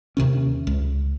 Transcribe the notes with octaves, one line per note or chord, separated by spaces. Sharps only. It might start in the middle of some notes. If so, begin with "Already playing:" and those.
D#2 C3 D#3 C#4
C#2